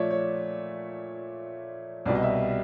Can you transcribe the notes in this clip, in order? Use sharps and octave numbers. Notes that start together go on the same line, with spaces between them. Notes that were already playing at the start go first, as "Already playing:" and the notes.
Already playing: A#2 F3 A3 C#5 D5 E5
C#5
C2 B2 G3 D5
D#5
E5